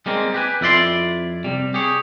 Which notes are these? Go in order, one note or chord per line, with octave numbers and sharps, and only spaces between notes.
G3 G#3 A#3 C4
G4 B4 G#5
F2 E4 D5 C6
C3 G3
G4 G#4 C#5